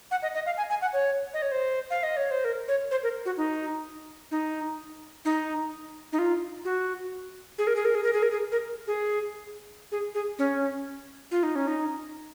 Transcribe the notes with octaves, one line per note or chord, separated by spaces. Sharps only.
F#5
D#5
D#5
F5
G#5
G#5
F#5
C#5
D#5
C#5
C5
F5
D#5
C#5
C5
A#4
C#5
C5
A#4
F#4
D#4
D#4
D#4
D#4
F4
F#4
G#4
A#4
G#4
A#4
G#4
A#4
G#4
A#4
G#4
A#4
G#4
G#4
G#4
C#4
F4
D#4
C#4
D#4